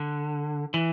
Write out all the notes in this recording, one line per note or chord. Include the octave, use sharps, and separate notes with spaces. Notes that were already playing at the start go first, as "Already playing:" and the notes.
Already playing: D3
E3